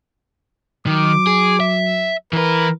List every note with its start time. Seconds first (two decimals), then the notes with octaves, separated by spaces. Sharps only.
0.87 D#3 F#3 D6
1.27 G#4
1.60 E5
2.33 E3 A#4 B4